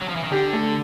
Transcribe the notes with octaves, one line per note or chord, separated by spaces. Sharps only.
F#3
F3
E3
D#3
D3 G4
A3 A4